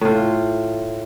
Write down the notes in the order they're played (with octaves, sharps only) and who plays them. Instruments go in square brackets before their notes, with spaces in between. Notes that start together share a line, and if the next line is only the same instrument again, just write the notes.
[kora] A2 F4